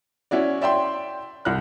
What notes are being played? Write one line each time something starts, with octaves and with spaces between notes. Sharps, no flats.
C#4 E4 F#4 D5
D5 E5 G5 C6
C2 F#6